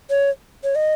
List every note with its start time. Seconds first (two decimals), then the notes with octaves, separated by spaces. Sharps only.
0.10 C#5
0.63 C#5
0.75 D#5